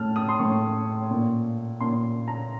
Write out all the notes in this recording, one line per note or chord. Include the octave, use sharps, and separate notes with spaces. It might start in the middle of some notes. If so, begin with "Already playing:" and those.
Already playing: A2 A5 F6
D#6
C6
A2 C#6
A#2
A#2 C6
A#5